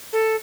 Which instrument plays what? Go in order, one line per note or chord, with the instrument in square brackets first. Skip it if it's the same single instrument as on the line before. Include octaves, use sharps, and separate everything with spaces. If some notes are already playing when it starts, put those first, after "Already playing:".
[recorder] A4